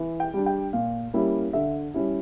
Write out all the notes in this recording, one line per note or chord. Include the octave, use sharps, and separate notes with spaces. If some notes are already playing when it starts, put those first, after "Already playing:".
Already playing: E3
G5
G3 D4
G5
A#2 F5
G3 A#3 C#4 E4
D3 E5
G3 C#4 E4